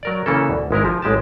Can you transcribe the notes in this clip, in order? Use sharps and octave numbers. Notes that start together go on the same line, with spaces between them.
F#3 A#4 D5
C#3 E3 A#3 C#4 A4
D2
G#1 G#3 E4 A#4
F3
A1 G#3 G4 A5